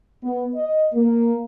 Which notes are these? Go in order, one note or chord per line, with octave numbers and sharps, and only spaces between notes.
B3
D#5
A#3